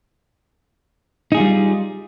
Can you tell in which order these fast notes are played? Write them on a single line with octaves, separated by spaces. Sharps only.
D#4 G#4 F4 G3